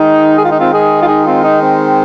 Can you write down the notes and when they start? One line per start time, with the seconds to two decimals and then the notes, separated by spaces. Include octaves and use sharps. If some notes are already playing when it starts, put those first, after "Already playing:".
Already playing: D#3 G#3 D#4
0.36 G#4
0.43 F4
0.51 D#4
0.59 C4 F4
0.72 D#4 G#4
1.02 F4
1.08 D#4 G#4
1.25 C4 F4
1.43 D#4
1.62 C4